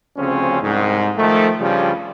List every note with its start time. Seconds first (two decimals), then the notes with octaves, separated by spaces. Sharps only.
0.17 D2 C#3 F3 C4 C#4
0.61 C2 G#2
1.16 D#3 F3 A3
1.59 G2 C#3 F3 G3